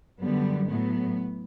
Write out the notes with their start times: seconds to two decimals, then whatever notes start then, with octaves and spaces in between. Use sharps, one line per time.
0.20 F#2 D3 G3 B3
0.68 A2 F#3 A3 B3